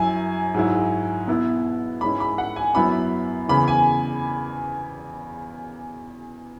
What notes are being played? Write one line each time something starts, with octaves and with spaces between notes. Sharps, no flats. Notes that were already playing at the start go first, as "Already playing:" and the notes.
Already playing: F#2 F#3 E4 G#5
G#2 F#3 E4
B2 B3 E4
G#2 G#3 C#4 E4 B5
B5
F#5
G#5
F#2 F#3 B3 E4 B5
E2 C#3 E3 B5
G#5